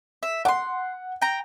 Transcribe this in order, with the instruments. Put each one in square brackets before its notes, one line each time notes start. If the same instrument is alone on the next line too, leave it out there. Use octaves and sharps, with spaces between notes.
[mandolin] E5
[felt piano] F#5 [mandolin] C6 D6
[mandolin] G5 A#5